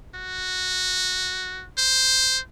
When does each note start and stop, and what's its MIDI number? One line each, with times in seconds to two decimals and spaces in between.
0.15 1.65 66
1.78 2.40 72